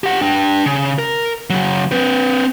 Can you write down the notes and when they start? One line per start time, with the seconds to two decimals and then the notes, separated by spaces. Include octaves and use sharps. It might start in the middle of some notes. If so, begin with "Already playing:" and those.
0.04 G4 F#5
0.21 D4 G5
0.66 C#3
0.99 A#4
1.50 C#3 F#3
1.92 C4 B4